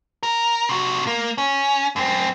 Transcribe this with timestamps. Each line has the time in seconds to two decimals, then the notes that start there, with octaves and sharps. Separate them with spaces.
0.23 A#4
0.69 C3 F#4
1.07 A#3
1.38 C#4
1.96 F#2 C4